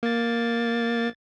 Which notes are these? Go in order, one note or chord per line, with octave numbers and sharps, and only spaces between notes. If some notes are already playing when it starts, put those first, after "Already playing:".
A#3 A6